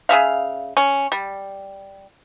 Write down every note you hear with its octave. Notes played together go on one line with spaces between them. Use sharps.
C#3 G#4 E5 F5
C#4
G3